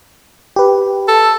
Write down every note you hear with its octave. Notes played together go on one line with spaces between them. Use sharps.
G4 B4
A4